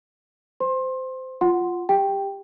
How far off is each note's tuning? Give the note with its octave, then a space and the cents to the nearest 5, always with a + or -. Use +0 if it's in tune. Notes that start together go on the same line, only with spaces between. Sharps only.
C5 -20 C6 +25
F4 +0 F#5 +0 C6 +0
G4 +15 G5 +0